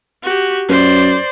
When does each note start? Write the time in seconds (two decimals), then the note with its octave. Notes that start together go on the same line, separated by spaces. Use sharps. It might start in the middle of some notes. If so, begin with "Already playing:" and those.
0.23 F#4 G4
0.69 F#2 C5 D5